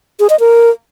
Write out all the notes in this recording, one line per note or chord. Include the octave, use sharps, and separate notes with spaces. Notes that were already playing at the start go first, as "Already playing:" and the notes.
G#4
D#5
A#4